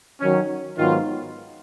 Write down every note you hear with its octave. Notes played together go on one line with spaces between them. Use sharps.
D#3 F#3 C#4
G#2 D#3 F#3 B3 F4